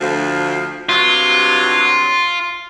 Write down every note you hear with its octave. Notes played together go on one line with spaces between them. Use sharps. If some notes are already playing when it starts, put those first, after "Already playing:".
D2 F3
G2 C3 F#3 F4